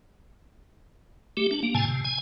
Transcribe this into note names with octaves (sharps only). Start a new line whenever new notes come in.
A3 G4
D4
A#3
A2 C3 G#5 A5
C3
G#5